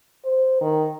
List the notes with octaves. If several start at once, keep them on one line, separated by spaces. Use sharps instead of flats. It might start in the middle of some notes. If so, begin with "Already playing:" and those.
C5
D#3